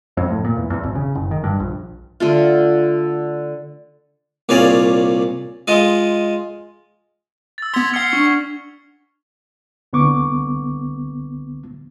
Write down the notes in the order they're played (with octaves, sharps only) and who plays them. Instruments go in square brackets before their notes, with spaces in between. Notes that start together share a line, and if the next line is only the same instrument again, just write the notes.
[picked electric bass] F2
A2
A#2
E2
E2
G#1
C#3
F#1
D#3
G2
A#1
[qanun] D3 A3 F4
[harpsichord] C2 A#2 G#4 C#5 D5 F5
G#3 F4 D#5
[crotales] E6 A6
[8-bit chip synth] B3 C6 [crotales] G#6 B6 F7
[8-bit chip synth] F#5 C#7 [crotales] F6 C7 G7
[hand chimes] D4 [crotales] C#6
[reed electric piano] C2 D3 B3 C#6 D6